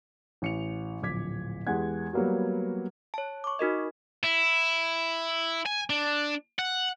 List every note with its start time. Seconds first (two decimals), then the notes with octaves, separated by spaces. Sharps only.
0.42 A1 C#7 F7
1.02 D1 A#1 D6 G#6 B6
1.67 E2 G#3 G4 F#5 G#6
2.13 F#3 G3 A#3 B3 F#4
3.14 C#5 A5
3.44 C#6 D6
3.59 D#4 F#4 A#4 D#5
4.23 E4
5.66 G#5
5.90 D4
6.59 F#5